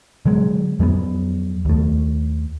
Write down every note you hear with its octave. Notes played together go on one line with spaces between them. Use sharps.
D3 F#3 G#3
F2 F#3 G3 B3
D#2 A3